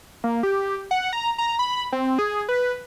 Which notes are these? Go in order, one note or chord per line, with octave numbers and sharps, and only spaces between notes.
A#3
G4
F#5
A#5
A#5
B5
C4
G#4
B4